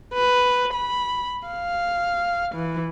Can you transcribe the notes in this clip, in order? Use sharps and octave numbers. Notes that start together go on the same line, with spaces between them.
B4
B5
F5
E3